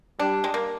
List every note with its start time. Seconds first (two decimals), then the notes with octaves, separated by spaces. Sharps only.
0.19 G3 D4
0.44 G#3
0.54 A#3